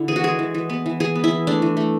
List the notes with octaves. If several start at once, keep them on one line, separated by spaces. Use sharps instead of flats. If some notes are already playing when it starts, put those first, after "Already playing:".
Already playing: D3 E4
E3 G#4
F#4
G#3 G#4
E3
E3
B3
E3
E3 G#4
B3
E4
E3
A3 D4
E3
A3